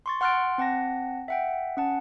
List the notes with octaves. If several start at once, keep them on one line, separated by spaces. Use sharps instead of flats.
C6 C#6 A6
F#5 C6 F6 F#6 A6 D7
C4 F#5 A5 A#6
E5 F#5 G5
C#4 F#5 A5